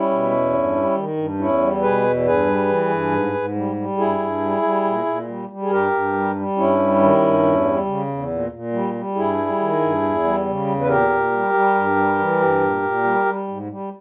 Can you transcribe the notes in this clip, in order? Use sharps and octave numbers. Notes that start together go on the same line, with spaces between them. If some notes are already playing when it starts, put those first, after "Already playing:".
Already playing: G3 C#4 E4
B2
E2
G2
G3
D#3
G2
E2 C#4 E4
G3
B2 G#4 B4
E2
G2 G#4 B4
G3
E3
G2
G#2
G#2
G3
G3
G2 E4 G#4
G2
G3
G3
A#2
A#2
G3
G3
G#4
G2 G4 A#4
G2
G3
G3
G2 C#4 E4
G3
D#3
G2
E2
G3
C#3
E2
A#2
A#2
G3
G3
G2 E4 G#4
G3
D#3
G2
E2
G3
C#3
E2
B4
A#2 G4 A#4
A#2
G3
G3
G2
G3
E3
G2
A#2
A#2
G3
G3
G#2
G3